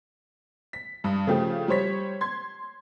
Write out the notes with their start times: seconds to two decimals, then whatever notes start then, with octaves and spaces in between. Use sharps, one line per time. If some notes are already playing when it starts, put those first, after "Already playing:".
0.73 B6
1.04 G2 D#6
1.27 C#3 F3 A3 G4
1.68 G3 C5 C#5 B6
2.21 C6 G#6